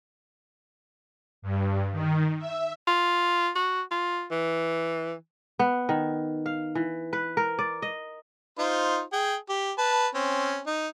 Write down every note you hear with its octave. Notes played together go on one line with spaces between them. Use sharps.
G2
D#3
E5
F4
F#4
F4
E3
B3
D#3
F5
E3
B4
A#4
D5
D#5
D#4 F4 C5
G#4 G5
G4
B4 A5
C4 C#4
D#4